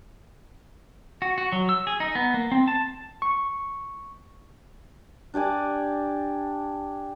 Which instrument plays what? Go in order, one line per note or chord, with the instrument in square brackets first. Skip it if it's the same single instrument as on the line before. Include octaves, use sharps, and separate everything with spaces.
[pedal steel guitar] F#4
F#4
F#3
E6
G#4
D#4
B3
A#3
C4
A5
[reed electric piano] C#6
[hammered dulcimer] D4 G4 D5 G#5